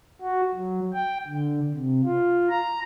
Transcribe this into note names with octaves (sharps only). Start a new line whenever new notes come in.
F#4
F#3
G5
D3
C3
F4
A#5